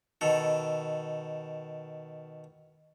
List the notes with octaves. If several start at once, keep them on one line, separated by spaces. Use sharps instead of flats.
B2 D#3 A4